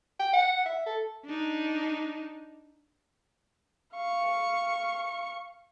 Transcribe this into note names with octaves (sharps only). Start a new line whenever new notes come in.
G5
F#5
E5
A4
D4 D#4
F5 C#6